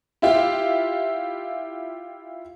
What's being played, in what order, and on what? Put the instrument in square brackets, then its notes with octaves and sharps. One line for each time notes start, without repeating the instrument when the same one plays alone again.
[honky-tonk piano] E4 F4 G4